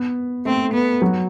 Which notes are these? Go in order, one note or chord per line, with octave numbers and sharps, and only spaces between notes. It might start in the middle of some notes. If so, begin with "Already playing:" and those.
Already playing: B3 B4
A3 C4 A4
B3
F#3 F#4